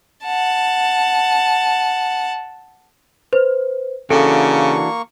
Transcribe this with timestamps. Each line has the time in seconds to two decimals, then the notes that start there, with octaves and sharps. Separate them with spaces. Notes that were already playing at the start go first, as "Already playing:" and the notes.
0.25 F#5 A5
3.33 B4 C5
4.10 C#3 E3 A#3 D4 F#4 A4 C#6